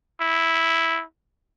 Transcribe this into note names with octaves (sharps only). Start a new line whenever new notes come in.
E4